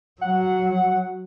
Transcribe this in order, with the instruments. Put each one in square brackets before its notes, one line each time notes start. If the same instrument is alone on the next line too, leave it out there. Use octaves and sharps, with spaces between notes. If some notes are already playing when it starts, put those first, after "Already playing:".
[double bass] F#3 [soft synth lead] F#5